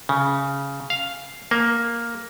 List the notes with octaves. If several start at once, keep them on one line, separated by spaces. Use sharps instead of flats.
C#3
F5
A#3